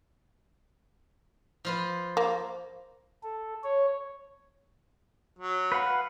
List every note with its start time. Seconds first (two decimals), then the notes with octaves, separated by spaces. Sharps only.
1.65 F3 F4 B4
2.17 A#3
3.23 A4
3.63 C#5
5.39 F#3
5.72 B4 F5 F#5